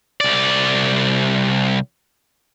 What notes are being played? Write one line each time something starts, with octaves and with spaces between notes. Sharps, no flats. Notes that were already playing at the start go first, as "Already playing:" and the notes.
C2 D5